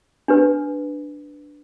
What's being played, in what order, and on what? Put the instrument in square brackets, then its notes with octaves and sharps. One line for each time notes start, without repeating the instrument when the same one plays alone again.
[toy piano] D4 G4 B4